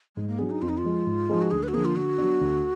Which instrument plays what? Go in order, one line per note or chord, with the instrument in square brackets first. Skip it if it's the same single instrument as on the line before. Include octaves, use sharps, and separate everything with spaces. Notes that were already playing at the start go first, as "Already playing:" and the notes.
[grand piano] G#2 [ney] G#3
[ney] A#3
[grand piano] F#3 D4 G#4 [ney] B3
[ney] D#4
[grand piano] F2 [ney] F4
[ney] D#4
F4
[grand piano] F3 G#3
G#2
F3 G#3 D#4 G#4
[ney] F#4
[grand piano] D2 [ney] G#4
[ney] B4
F#4
[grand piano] D3 F3 A#3 [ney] G#4
[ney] F4
[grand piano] D3 [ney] F#4
[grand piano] F#3 B3 D4
D2